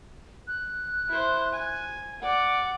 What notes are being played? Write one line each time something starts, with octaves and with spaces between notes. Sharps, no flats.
F#6
E4 C5
G#5
D5 F#5